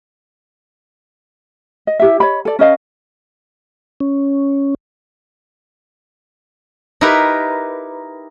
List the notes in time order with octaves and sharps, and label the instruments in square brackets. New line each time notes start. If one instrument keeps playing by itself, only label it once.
[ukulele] D#5
E4 G4 E5
C#5 D#5 B5
A4 D5
C#4 A#4 D#5 F5
[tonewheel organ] C#4
[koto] D#4 E4 G4 A#4 B4